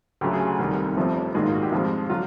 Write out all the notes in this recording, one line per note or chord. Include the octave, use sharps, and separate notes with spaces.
D2 C#3 F#3 A3 G4
G#4
C2 C3 D#3 G3
G1 F2 C3 F3 A3
A#1 G#2 D#3 G#3 F#4
F4
F#4
G4
F2 C3 F3 G#3 F4
D3 F#3 F4